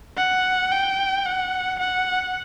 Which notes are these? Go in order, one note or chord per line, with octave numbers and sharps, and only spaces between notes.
F#5
G5
F#5
F#5